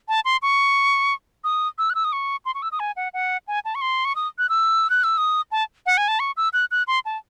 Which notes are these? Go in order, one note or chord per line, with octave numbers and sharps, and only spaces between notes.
A5
C6
C#6
D#6
E6
F#6
E6
D#6
C#6
C6
C#6
E6
D#6
G#5
F#5
F#5
G#5
A5
C#6
C6
C#6
D#6
F#6
E6
F#6
E6
D#6
A5
F#5
G#5
A5
C#6
E6
F#6
F#6
C6
A5